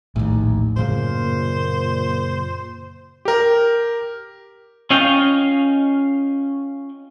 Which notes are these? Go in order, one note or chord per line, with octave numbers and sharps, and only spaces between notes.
A#1 D#2 A2
F#2 A#2 C#3 A#3 C5
G4 A#4
C#4 F4 D#5 F5 G5